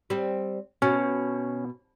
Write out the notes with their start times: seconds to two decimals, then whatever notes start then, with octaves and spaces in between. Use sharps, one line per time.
0.10 G3 C4
0.82 B2 C#4